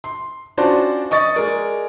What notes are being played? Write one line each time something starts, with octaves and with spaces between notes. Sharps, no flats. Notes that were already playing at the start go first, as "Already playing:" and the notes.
C6
C#4 D4 F4 F#4 C5 D5
D#5 C#6 D#6 A6
G#3 A#4 D5